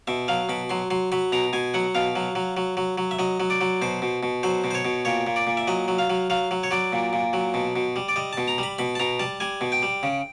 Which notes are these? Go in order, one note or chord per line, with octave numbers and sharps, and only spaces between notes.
B2 E5
F#3 F5
B2 B5
F#3 C6
F#3 C6
F#3 B5
B2 A#5
B2 G#5
F#3 F#5
B2 F5
F#3
F#3
F#3
F#3
F#3
E5
F#3 D#5
F#3
D5
F#3
B2 C5
B2
B2
F#3 C5
B2
C5
C#5
B2
A#2 C#5
A#2
D5
A#2
E5
F#3 D#5
F#3
F5
F#3
F#3 F5
F#3
C#5
F#3 D5
A#2
A#2
F#3
B2
B2
G3
D5
G3 D#5
B2 A5
A#5
G3 B5
B2 B5
A5
B2 A#5
G3 A5
G3 G#5
B2
G5
G3
C#3